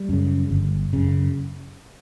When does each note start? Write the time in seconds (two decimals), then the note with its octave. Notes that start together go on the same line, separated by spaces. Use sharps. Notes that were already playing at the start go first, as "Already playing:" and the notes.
Already playing: G3
0.09 F#2 C#3
0.51 G1
0.93 F#2 C#3